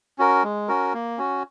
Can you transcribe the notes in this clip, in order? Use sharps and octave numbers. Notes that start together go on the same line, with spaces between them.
C#4 F#4 A#4
G#3
C#4 F#4 A#4
A#3
C#4 F#4